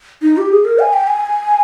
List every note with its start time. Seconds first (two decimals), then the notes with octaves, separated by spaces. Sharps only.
0.22 D#4
0.37 G4
0.51 G#4
0.65 A#4
0.79 G#5
0.93 G5
1.07 G#5